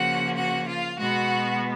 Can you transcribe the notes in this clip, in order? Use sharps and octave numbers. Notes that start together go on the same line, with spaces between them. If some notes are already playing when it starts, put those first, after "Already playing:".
Already playing: C#3 F3 A#3 F#4 F#5
F#4 F#5
F4 F5
B2 G#3 B3 F#4 F#5